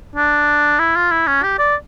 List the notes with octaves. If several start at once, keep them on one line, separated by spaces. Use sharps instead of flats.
D4
E4
F4
E4
C#4
G4
D5